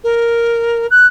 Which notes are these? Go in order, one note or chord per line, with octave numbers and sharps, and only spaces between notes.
A#4
F#6